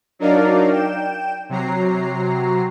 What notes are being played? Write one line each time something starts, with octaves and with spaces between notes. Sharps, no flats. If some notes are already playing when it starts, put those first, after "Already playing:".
F#3 D4 D#4 A#4 D5 F5
G5 E7
C3 F#3 A#5 C7